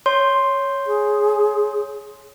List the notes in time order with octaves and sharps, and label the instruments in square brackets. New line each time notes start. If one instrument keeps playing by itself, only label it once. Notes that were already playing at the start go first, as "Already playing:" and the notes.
[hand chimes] C#5 [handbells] C6
[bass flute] G#4